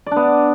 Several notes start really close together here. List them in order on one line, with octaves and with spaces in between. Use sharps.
D5 D4 B3